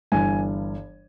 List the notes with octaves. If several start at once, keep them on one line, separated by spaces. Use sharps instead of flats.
G1 G2 E3 G#5